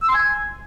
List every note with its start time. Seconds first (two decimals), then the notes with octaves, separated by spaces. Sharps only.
0.02 E6
0.08 C6
0.15 G#5